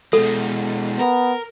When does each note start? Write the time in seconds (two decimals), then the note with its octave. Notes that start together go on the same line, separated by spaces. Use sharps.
0.13 B2 G#3 A4
0.99 B3 A#4